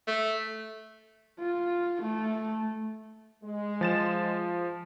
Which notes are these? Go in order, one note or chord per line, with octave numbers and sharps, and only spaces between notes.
A3
F4
A3
G#3
F3 A6 E7